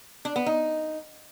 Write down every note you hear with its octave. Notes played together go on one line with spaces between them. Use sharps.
D4
B3
D#4